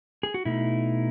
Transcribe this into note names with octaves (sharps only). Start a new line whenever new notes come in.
G#4
F#4
B2 A3 D#4 E4